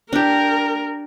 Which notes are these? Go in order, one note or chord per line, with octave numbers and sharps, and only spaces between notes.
D4 G4 A#4